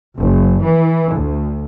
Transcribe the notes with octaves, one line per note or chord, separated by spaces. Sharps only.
F#1
E3
D2